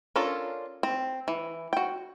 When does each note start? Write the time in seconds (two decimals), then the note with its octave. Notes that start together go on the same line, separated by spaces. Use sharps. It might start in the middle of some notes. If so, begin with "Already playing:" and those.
0.16 C#4 D4 F4 A4 A#4
0.83 C4
1.28 E3
1.73 F#4 G5